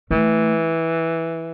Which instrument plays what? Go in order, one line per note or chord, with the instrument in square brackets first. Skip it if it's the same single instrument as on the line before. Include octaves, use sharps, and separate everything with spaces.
[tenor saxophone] E3 [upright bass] A3